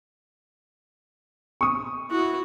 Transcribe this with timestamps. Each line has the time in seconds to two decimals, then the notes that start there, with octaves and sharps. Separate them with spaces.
1.61 C#6 D#6
2.11 E4 F#4